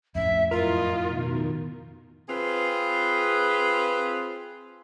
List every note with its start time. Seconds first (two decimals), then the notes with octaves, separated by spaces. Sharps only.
0.15 F2 A2 C#4 E5
0.51 F#2 E4 F4 A#4 D#5
1.06 B2 D#3
2.29 C4 F4 G#4 B4